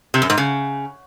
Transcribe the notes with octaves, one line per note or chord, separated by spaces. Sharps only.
C3
F#2
G#2
C#3